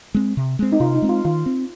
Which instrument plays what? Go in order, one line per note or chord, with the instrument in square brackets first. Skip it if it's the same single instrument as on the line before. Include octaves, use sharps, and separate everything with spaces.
[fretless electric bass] G#3 C4
C3
G#3 C4
[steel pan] D#4
[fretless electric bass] C3 [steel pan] F4
[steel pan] D#4
[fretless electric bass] G#3 C4
[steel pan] F4
[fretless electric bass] D#3 [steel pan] F4
[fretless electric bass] C4